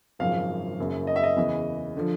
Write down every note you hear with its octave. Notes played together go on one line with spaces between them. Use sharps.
G#1 F#2 C#3 F3 F5
F#1 F#2 C#3
D#5
E5
D#5
E2 C#3 E3
D3 F3